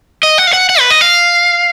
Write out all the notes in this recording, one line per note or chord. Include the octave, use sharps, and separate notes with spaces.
D#5
F#5
F5
F#5
F#5
B4
D#5
F5